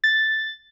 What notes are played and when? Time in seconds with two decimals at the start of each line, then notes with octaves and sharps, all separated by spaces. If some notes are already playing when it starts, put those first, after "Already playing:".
0.04 A6